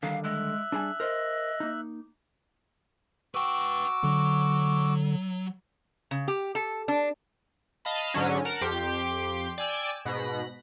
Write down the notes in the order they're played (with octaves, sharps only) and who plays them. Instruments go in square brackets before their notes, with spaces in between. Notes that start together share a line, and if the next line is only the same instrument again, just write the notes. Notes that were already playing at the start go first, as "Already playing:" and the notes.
[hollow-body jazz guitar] D3 D#3 G3 [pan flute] F5
[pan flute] G#3 [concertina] E5 F#6
[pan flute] G3 [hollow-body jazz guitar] D4 G#4 G#5
[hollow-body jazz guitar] A#4 C5 [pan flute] D#5
[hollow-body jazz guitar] A#3 D#4
[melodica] F#4 D6 E6 [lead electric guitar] B4 G5
[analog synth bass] D3 [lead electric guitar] F#3
[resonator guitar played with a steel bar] C#3
G4
A4
D4
[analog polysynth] D#5 F5 A5 B5
G#2 D3 F#3 C#4
A#4 F#5 A5
F2 G4 G5 C6 D6
D5 G5 G#5 D6 E6
G#2 B2 B5 F#6 A#6